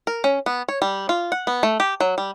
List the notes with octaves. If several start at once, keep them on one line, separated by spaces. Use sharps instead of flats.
A#4
C#4
B3
C#5
G3
F4
F#5
B3
A3
G4
F#3
G3